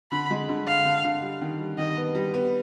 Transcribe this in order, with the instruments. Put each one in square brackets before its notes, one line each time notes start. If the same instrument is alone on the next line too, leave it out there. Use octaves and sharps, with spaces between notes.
[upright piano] D3 [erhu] B5
[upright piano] G#3
D3
[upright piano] D3 [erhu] F5
[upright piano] D3
D3
G3
D#3
G3
[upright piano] D#3 [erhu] D#5
[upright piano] B3
G3
B3